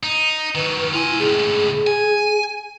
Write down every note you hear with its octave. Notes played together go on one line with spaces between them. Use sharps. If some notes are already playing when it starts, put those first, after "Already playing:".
D#4
D#3 F#3 B4
E4 F4 G#5
C#2 A2 G#4
G#5